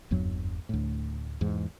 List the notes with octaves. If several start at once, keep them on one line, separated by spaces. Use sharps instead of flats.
F#1 E2 G2 F#3
D2 A2
E2 G#2